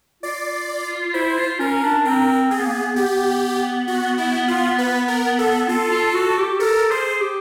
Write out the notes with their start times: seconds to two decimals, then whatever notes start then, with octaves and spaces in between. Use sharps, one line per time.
0.23 F4 D5
1.14 E4 C5
1.38 F4
1.59 C#4 A#4
1.83 D4
2.05 C4 A#4
2.51 C4 G#4
2.59 B3
2.65 A#3
2.73 B3
2.96 B3 G4
3.88 F#4
4.18 E4
4.48 F4
4.78 B4
5.08 A#4
5.39 A4
5.69 F4 A4
5.91 F4
6.14 F#4
6.38 G4
6.59 A4 A#4
6.91 G#4 C5
7.21 G4